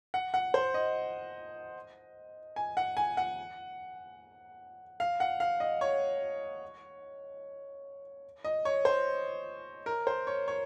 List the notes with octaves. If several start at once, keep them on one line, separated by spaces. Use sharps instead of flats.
F#5
F#5
C5
D#5
G#5
F#5
G#5
F#5
F5
F#5
F5
D#5
C#5
D#5
C#5
C5
A#4
C5
C#5
C#5